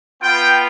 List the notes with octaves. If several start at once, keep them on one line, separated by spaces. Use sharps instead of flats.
B3 F4 G5